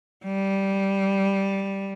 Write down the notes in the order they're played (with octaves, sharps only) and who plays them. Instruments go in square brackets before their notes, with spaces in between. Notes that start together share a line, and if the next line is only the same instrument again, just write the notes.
[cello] G3